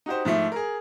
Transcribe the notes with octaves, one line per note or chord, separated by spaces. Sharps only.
D#4 F#4 G4 C5
G#2 F3 A3 E4
G#4 A#4